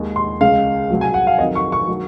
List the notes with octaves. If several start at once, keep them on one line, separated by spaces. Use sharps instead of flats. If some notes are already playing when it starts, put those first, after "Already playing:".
Already playing: D#2 D#3 G#3
C6
C#2 C#3 G#3 F5
C2 C3 F#3
G#5
F#5
F5
F2 D#3 F#3 D#5
C#6
C#6
D#3 F#3